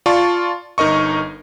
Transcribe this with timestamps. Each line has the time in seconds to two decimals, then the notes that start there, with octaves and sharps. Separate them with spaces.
0.06 F4 D5 A5 C#6
0.78 G1 D#4 A#4 D#5 C#6